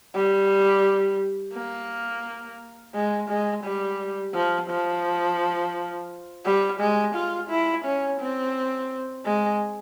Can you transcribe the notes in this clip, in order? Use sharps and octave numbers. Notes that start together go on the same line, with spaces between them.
G3
A#3
G#3
G#3
G3
F3
F3
G3
G#3
F4
E4
C#4
C4
G#3